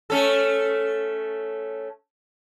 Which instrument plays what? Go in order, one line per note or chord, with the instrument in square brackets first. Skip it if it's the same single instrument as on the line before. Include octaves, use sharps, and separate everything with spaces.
[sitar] A3 C#4 A4